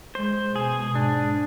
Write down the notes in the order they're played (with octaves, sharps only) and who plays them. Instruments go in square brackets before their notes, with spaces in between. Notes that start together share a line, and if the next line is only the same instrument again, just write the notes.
[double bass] G#3 [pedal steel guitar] C5
[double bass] B2 [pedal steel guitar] G#4
[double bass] G#2 [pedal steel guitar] D4